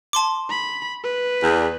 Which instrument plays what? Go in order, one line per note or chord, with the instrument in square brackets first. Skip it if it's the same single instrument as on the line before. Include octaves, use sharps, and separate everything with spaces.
[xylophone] A5 C6 D6
[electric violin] B5
B4
[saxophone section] E2 G#4 D5